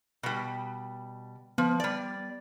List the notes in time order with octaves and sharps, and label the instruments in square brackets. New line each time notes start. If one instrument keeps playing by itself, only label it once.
[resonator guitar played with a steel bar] B2 G3
[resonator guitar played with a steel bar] F3 [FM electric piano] B3
[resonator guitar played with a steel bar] G3 D5